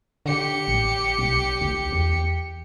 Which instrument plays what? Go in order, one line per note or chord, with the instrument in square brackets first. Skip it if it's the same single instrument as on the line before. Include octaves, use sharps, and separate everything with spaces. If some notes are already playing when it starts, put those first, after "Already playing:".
[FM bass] D3 [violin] G4 C#7
[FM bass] A1
B1
D2
E2